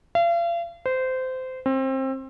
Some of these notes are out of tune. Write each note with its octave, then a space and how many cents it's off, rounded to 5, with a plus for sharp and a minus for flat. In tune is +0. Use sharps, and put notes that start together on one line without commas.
F5 -40
C5 -20
C4 +25